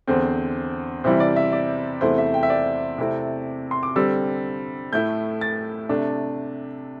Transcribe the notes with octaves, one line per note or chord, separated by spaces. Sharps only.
E2 D3 C4 C5
C3 E3 G3 E4 C5
D5
E5
D5
E2 C3 A3 E4 C5
E5
G5
E5
D5
C3 A3 C4 E4
C6
D6
D3 G3 C4 E6
A2 A3 E4 G6
A6
C3 A3 D4